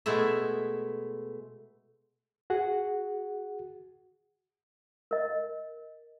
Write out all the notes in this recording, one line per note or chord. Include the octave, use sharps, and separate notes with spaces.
B2 G#3 A3 E4 E5
F#4 G#4 F#5
A#4 D#5